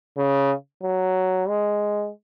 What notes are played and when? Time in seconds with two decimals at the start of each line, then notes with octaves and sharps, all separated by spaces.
0.17 C#3
0.84 F#3
1.49 G#3